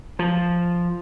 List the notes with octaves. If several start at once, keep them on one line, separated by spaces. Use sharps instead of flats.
F3